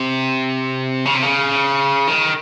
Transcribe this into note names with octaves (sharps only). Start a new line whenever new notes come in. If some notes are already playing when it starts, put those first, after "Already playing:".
Already playing: C3
C#3
C3
C#3
D#3